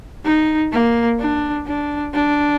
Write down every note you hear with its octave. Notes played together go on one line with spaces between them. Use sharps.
D#4
A#3
D4
D4
D4